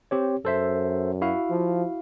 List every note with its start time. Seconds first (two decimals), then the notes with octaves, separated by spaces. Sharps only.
0.11 C4 G4 C#5
0.45 F#2 A4 C5 E5
1.22 E4 F#4 F5
1.50 F3